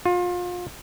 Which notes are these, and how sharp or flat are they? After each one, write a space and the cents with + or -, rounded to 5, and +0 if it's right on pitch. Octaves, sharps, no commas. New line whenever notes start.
F4 +30